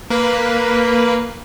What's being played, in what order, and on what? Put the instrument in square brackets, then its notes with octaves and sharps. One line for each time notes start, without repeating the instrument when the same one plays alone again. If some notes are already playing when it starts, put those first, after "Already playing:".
[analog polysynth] A#3 B4